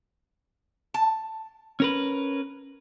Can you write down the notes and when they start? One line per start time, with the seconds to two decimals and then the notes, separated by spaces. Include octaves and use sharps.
0.94 A5
1.80 C#4 A#4 B4